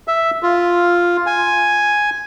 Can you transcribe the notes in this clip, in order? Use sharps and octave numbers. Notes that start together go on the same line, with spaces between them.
E5
F4
G#5